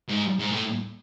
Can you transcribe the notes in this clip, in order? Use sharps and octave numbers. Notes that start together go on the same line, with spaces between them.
G#2
G#2
A2